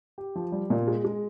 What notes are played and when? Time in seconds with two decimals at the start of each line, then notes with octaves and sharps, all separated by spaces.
0.18 G4
0.35 F3
0.52 G3
0.70 A#2
0.88 G#3
1.05 G#3